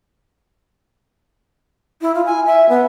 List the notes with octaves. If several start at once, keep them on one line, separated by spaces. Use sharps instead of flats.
E4
F4
G#5
E5
B3